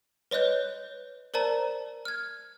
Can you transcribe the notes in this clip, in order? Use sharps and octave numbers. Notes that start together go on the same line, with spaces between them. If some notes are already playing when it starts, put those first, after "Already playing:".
B4 C#5 D#5 F#6 G6
A#4 C5 D5 A5 A#5
F6 G#6